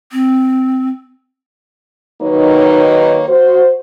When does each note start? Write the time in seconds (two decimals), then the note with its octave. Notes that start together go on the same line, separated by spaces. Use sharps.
0.12 C4
2.22 D#3 F#3 A#3 D#4 B4 C#5
3.28 F#4 C5